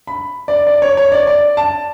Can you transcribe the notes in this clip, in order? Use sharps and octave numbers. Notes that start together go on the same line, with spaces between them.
B5
D5
D5
C#5
C#5
D5
D5
A5